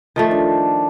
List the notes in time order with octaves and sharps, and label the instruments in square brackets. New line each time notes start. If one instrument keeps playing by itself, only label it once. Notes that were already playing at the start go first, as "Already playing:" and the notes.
[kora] D#3 F3 A3
[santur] D4